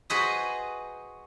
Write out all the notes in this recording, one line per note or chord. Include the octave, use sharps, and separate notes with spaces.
F#4 G#4 B4 C5 D#5